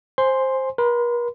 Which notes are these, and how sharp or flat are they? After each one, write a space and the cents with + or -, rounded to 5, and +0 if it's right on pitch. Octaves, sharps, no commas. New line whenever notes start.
C5 +10 G#5 +0 C6 +0
A#4 +45 C6 -35